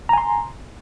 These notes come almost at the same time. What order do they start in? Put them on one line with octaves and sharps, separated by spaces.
A#5 G#5 C6